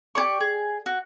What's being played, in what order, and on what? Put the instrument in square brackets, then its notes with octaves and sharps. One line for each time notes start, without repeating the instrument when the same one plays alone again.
[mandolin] G4 G#4 D5 C#6
G#4
F#4